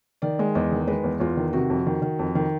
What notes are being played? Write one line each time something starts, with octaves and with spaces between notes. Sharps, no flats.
D#3 D5
G#3
E2 D#5
D#3
G#3 B4
E2
E2 F4
D#3
C3 F#4
F2
D#3
D#3
F2
D#3